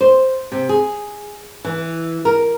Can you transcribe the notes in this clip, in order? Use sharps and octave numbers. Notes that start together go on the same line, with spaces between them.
C5
C3
G#4
E3
A#4